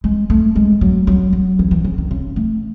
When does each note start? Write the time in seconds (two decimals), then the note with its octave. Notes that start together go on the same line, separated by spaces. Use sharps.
0.04 G#3
0.30 A3
0.56 G#3
0.81 F#3
1.07 F#3
1.33 F#3
1.59 E3
1.71 E3
1.85 C#3
1.98 D#3
2.11 C#3
2.36 A3